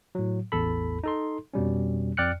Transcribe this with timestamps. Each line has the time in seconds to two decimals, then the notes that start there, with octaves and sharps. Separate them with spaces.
0.15 A2 F#3
0.52 A1 E2 A4 B5
1.04 D#4 A4 C6
1.54 F2 B2 G3 C#4
2.17 F2 D5 G5 F6 F#6 C#7